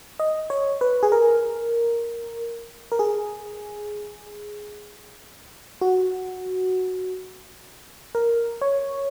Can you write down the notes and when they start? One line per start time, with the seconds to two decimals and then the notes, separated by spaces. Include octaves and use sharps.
0.20 D#5
0.50 C#5
0.81 B4
1.03 G#4
1.12 A#4
2.92 A#4
2.99 G#4
5.81 F#4
8.15 A#4
8.61 C#5